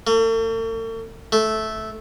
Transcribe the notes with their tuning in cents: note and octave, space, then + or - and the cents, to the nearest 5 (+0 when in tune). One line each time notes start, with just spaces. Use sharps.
A3 +45
A3 -10